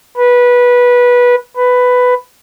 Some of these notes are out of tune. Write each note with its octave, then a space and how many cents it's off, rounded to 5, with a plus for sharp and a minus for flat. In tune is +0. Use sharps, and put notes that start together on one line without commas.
B4 -15
B4 +10